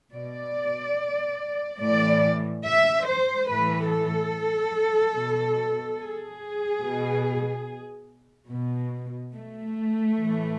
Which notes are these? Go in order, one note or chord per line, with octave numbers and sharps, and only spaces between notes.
B2 D5
A2 E3 D5
E5
C5
A2 E3 B4
A4
B2
G#4
B2
B2
A3
A2 E3